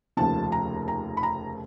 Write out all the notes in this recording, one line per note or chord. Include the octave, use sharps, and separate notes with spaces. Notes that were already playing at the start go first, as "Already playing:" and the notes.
F1 D#2 C#3 F3 A5
A#5
A#5
B5
A#5